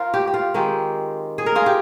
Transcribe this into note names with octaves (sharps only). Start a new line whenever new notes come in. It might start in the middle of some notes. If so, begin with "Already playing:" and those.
Already playing: F4 A#4 C5
G4
G4
F4
D#3 G#3 C4 G4
G#4
A#4
F4 G#4
G4